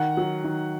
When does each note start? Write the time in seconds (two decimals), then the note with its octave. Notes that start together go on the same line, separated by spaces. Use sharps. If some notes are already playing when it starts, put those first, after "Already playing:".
Already playing: D#3 F#5
0.17 F#3
0.44 D#3